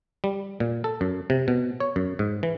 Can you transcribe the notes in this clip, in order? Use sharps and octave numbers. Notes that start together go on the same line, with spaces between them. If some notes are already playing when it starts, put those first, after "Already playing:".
G3
A#2
A4
F#2
C3
B2
C#5
F#2
G#2
E3